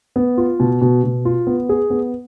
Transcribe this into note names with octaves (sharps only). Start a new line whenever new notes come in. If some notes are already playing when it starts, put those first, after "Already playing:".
B3
F4
B2
B2
B2
F4
B3
G#4
B3